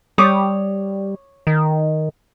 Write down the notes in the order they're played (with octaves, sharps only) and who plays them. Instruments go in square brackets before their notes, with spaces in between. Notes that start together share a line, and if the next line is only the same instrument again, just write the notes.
[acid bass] G3 [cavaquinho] C#5 D6 D#6
[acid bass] D#3